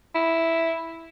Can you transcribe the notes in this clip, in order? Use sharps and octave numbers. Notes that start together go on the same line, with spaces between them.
E4